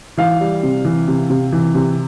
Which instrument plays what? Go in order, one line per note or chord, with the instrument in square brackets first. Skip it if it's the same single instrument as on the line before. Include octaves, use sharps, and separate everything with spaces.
[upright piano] E3 F5
G3
C3
E3
C3
C3
E3
C3